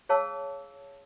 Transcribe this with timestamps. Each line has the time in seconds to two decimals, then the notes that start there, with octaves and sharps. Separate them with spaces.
0.09 G#4 C#5 F5 A5 E6